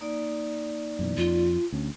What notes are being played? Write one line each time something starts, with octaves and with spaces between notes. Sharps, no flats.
A#3 D#4 D5
F#2 B2 E3
F2 F4
D2 C#4